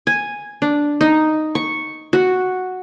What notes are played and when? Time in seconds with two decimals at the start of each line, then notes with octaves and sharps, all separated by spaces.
0.07 G#5
0.62 D4
1.01 D#4
1.55 C#6
2.13 F#4